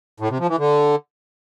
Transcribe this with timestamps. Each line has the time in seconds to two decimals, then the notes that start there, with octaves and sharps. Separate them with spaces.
0.20 A2
0.30 C3
0.39 F3
0.49 E3
0.58 D3